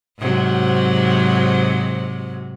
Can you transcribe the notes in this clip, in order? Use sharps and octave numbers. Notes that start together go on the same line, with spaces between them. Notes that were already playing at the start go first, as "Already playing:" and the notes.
G#2 C3 F#3